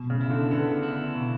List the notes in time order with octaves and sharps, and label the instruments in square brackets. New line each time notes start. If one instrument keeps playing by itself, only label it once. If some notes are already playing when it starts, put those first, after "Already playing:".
Already playing: [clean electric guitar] B2
[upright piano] C#3
[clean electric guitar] E4
[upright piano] D3
[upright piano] D3 [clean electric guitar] B3
[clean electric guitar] E4
B2